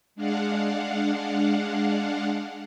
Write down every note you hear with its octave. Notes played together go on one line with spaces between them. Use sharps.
G#3 D4 F5 F#5